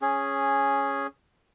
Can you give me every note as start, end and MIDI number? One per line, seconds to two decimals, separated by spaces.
0.02 1.07 61
0.02 1.07 68